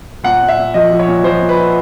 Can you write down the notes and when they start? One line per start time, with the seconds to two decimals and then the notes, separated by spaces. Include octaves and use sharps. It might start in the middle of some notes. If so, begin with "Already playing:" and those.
0.23 A#2 F#5
0.41 A#2
0.48 E5
0.57 A#2
0.74 F3 D#5
0.91 F3
0.99 C#5
1.07 A#2
1.23 F3 C5
1.40 A#2
1.49 B4
1.57 A#2